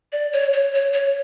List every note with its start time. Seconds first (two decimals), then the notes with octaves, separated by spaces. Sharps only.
0.12 D5
0.33 C#5
0.53 C#5
0.73 C#5
0.93 C#5